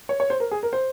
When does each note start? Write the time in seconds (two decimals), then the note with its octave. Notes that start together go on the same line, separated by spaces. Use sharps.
0.09 C#5
0.20 C#5
0.30 C5
0.40 A#4
0.51 G#4
0.63 A#4
0.73 C5